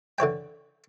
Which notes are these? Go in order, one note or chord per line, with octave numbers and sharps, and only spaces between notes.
D3 E3 C#5 G5